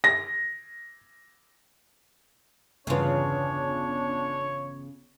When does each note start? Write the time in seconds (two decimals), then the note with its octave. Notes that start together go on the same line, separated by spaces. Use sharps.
0.04 A#6
2.87 G1 E2 C#3 B3 D4 F4 C#5